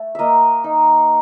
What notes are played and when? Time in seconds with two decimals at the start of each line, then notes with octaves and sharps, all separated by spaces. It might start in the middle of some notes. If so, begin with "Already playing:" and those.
Already playing: A3
0.15 A#3 D#5 E5
0.64 D#4